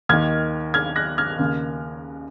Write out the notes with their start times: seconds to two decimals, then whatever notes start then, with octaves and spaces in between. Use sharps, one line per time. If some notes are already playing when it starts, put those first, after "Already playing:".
0.09 D#2 D#3 F6 G#6
0.74 F6 G#6
0.96 F#6 A#6
1.18 F6 G#6
1.39 D#2 C#3